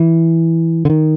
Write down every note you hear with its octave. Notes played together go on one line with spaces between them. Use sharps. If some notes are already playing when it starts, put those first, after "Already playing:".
Already playing: E3
D3
D#3